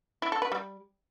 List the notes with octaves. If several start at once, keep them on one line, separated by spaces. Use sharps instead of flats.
E4
A4
B4
G3